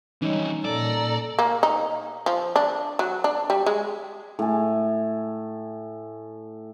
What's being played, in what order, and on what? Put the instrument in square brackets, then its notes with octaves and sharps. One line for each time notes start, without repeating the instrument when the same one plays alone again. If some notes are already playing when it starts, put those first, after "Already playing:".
[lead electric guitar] E3 G3 [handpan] C#4 D#4
[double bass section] A#2 [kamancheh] A4 A#5 [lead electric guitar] D5
[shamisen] A#3
D#4
F3
D4
F#3
D4
G3
G#3
[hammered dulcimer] A2 G#5